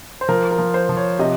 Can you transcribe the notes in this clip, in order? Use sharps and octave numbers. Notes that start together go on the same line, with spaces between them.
C5
F3 A#4
A#4
F3
C5
F3
C#5
C3 D#5